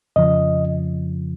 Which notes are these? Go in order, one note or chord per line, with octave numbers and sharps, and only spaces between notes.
F2 C#3 F3 D#5